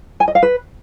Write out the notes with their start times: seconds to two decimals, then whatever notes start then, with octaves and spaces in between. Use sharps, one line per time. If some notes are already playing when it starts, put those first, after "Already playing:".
0.20 G#5
0.28 D#5
0.35 F5
0.43 B4